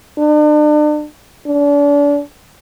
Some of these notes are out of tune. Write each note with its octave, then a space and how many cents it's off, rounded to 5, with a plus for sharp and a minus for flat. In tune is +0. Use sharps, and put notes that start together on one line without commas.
D4 +40
D4 -35